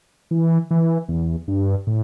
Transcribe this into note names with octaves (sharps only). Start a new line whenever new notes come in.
E3
E3
E2
G2
A2